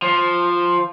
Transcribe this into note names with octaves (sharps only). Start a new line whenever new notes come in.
F3